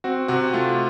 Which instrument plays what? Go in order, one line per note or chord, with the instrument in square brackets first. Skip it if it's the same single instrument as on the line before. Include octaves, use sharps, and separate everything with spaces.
[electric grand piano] C4 F#4
C3 F#4
A3 F4